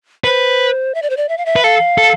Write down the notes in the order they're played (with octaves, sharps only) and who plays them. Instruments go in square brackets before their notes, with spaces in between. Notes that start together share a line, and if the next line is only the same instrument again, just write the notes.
[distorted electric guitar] B4 [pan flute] C5
[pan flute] E5
D5
C5
D5
E5
F5
E5
[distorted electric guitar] B4
[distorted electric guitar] A4 [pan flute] F5
[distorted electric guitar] A4